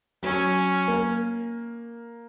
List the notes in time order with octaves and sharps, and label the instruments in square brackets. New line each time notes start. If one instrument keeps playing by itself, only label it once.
[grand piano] F#3 [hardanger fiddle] C#4
[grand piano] A#3